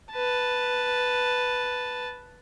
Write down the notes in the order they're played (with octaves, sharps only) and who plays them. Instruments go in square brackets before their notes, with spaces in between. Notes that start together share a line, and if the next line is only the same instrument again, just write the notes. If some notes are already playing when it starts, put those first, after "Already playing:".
[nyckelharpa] B4 A5